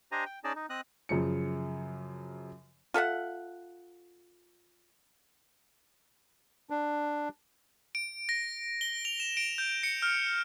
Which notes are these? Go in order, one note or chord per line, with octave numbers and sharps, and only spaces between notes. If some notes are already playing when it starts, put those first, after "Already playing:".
D4 G4 C5 D#5 G#5 A#5
G5
C#4 D#4 G#4 D5 D#5 A5
D#4
C4 D#5 D#6 F#6
F#2 C#3 F3 C#7
F4 A4 E5 F#5
D4
D7
A#6
G7
F7
E7
D7
G6
C#7
F6